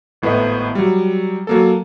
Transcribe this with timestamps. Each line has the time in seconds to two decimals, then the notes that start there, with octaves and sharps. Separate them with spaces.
0.22 G#1 A2 B3 B4 D#5
0.75 F#3 G3
1.47 F#3 A#3 A4